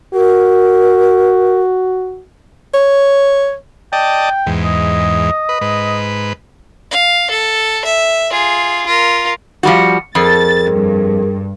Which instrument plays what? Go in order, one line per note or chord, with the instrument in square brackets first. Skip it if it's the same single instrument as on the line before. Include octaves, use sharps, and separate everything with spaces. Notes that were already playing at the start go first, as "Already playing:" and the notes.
[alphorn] F#4 [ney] A#4
[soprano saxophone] C#5
[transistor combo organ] D5 D#5 A5 [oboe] G5
[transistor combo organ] E2 G#2
[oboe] D#5
[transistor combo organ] B4
G#2 B4
[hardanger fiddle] F5
A4
E5
F4 G#4
F4 A#4
[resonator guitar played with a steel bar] F3 G3 F#4
[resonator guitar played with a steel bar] F2 [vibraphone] G#4 A#4 [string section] A6
[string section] G2